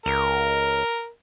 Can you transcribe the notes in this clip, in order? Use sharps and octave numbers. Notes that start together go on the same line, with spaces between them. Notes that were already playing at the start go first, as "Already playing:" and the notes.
C#2 A#4